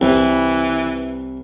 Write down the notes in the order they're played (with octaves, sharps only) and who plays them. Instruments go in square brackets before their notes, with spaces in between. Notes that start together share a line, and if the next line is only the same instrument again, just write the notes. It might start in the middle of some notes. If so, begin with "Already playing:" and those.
[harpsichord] C2 [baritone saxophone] E3